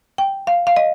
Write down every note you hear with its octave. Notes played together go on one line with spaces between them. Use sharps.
G5
F5
F5
D#5